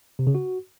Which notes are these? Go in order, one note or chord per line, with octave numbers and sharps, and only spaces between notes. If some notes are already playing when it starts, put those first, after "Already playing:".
C3
C#3
F#4